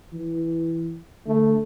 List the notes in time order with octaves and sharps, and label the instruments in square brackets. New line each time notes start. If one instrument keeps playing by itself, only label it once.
[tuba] E3
[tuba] D3 [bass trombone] A3